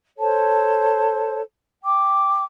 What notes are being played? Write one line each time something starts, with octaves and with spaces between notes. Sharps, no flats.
A4 C5 C#5 A5
G5 D6